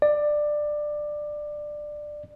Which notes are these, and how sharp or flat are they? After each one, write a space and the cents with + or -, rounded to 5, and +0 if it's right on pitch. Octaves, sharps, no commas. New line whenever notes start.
D5 +15